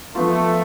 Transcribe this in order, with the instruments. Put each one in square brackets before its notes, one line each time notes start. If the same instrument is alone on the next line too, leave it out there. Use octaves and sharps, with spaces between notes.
[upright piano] F3 B3 F4 [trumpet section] A3